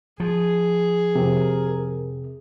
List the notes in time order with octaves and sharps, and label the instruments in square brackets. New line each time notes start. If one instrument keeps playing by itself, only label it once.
[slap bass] F3 [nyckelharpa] G#4
[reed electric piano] F2 C3 [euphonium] A#4